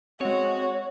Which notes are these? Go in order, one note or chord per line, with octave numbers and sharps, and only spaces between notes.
G#3 C4 F#4 C#5